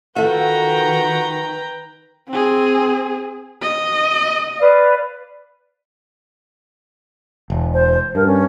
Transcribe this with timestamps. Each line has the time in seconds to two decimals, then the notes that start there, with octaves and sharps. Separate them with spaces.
0.16 D#3 F4 F#4 A4 B4 E5 G5 A#5
2.29 C4 G#4
3.62 D#5
4.59 B4 D5 F5
7.50 E1
7.74 C5
8.15 G2 A#4
8.26 C#4